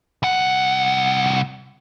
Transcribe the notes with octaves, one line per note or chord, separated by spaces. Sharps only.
C2 F#5